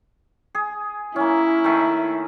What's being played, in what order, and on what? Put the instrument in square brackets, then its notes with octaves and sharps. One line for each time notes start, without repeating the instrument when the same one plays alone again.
[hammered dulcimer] G#4
[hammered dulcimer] A#3 C#4 [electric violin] E4
[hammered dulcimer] D#3 A3